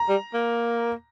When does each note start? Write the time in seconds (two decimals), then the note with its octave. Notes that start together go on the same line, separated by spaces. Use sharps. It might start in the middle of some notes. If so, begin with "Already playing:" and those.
Already playing: A#5
0.09 G3
0.34 A#3